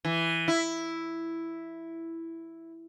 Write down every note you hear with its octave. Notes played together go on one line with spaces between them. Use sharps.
E3
E4